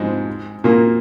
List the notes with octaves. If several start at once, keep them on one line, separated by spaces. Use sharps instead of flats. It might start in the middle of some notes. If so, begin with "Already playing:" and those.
Already playing: G#2 F3 G#3
A#2 A#3